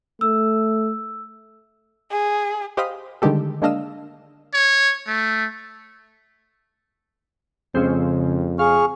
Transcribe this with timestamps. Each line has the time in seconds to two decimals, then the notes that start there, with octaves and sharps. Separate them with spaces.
0.21 A3 E6
2.11 G#4
2.77 G4 C5 D#5 F5 B5 D#6
3.22 D3 D#3 G3 G#3 G4 A4
3.62 G#3 A#3 D4 D#5 F5 E6
4.54 C#5
5.07 A3
7.75 F2 C#3 G#3 C4
8.59 G#4 F5 C#6 F6